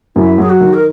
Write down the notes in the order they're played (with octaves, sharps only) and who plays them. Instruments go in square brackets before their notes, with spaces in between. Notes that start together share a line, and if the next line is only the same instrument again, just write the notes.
[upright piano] F#2 [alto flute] E4
[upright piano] F#3 [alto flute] G#4
[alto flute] F#4
[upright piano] D#3
[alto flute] A#4